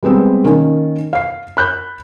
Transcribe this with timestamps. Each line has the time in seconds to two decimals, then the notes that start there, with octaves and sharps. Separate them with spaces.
0.03 G3 G#3 B3 C4 G4
0.45 D#3 A#3 C#4
1.13 F5 C7
1.57 B5 F#6 G6